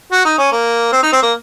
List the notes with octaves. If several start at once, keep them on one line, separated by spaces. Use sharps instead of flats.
F#4
D#4
C#4
A#3
C4
D#4
C4
A#3